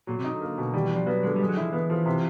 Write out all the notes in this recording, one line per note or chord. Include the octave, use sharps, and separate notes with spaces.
A#2 F#3
C3
D#4
D3
A#3
B2
D#3 G3
E3
D4
F3
F#3 B3
D3 G#3
G3 G#3
F#3
F3 E4
E3 B3
F3
C3